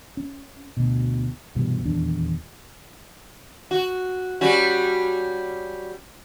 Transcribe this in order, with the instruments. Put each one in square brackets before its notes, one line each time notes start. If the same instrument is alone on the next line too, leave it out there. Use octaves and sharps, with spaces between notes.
[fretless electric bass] C#4
D2 B2
C2 G2 B2 E3
D#1 E2 D4
[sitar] F#4
G3 C#4 F#4